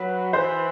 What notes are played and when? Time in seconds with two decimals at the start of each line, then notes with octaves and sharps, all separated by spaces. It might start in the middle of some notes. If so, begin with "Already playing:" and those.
Already playing: F#3 B4
0.33 E3 C5